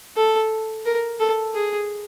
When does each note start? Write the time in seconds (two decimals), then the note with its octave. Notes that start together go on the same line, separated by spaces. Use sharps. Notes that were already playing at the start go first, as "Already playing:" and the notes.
0.17 A4
0.86 A#4
1.19 A4
1.54 G#4